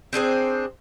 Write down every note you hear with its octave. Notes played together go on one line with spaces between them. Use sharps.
C4 D4 G#4 C5